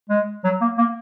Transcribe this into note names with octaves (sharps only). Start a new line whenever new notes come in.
G#3
F#3
A#3
A#3